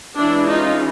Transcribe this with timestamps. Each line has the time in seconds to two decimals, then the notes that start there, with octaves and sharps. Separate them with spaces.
0.17 E3 G#3 C#4 D4 E4
0.47 D#4 F4